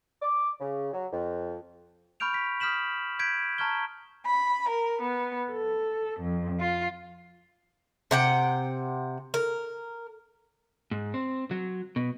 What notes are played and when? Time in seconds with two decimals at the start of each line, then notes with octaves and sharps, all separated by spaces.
0.22 D6
0.59 C#3
0.93 F#3
1.11 F2
2.20 B5 C#6 F6 G6 D7 F7
2.34 B6
2.60 D#6 F6 G6 B6 E7 F#7
3.19 G6 G#6 B6 D7
3.58 A5 A#5 C#6 F6 G#6 G7
4.26 B5
4.68 A#4
5.03 B3
5.52 A4
6.19 F2
6.60 F4
8.11 C3 F#5 G5
9.34 A#4
10.91 G#2
11.14 C4
11.51 F#3
11.96 B2